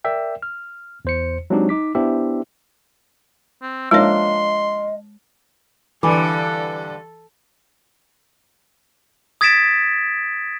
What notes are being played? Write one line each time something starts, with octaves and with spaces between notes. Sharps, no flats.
A#4 D5 E5 G5
F6
E2 C5 C#7
F#3 G#3 C4 D4 D#4 G4
D#4 D6 B6
B3 D4 E4 G4 C5 E5
C4
F3 G#3 A#3 D4 C#5 D#5 C6
G2 D3 E3 A4 G#5 B5 D6
D#6 G#6 A6 B6 D7 E7